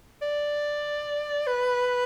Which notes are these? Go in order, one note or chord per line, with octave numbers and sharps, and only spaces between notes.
D5
B4